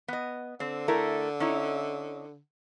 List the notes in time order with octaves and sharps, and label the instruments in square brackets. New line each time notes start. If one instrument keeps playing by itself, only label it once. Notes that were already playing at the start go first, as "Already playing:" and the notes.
[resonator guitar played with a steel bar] B3 D#5
[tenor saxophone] D3 [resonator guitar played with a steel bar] C4
[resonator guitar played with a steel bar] A3 E4 A#4
C#4 D#4 E4